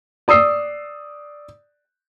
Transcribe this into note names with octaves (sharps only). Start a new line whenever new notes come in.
D5 D#6 E6 C7